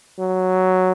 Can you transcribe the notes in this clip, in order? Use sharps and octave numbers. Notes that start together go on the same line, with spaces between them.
F#3